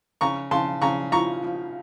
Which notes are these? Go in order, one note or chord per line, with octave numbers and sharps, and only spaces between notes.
C#3 A#5 C#6
C#3 A5 C6
C#3 A#5 C#6
F3 A#5 C#6
F3